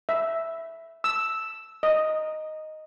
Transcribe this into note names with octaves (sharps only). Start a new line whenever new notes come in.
E5
E6
D#5